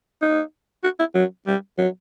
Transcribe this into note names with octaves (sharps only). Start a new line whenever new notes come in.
D#4
F#4
E4
F#3
G3
F#3